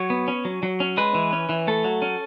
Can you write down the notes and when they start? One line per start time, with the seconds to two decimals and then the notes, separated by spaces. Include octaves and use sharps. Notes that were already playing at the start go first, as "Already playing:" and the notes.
Already playing: F#3 C#5
0.10 B3
0.28 C#4
0.45 F#3
0.63 F#3
0.80 C#4
0.97 G#3 B4
1.14 E3
1.33 C#4
1.49 E3
1.67 A3 A4
1.84 F#3
2.02 C#4